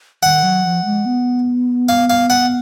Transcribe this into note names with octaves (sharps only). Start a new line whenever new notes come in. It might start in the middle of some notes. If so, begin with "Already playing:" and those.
D#3 F#5
F#3
F3
G#3
B3
F5
F5
F#5